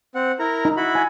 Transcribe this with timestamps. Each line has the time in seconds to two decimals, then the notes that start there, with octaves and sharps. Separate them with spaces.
0.15 C4 F#5
0.39 E4 A#4 A#5
0.65 D#4
0.77 E4 F#4 B5
0.95 G#5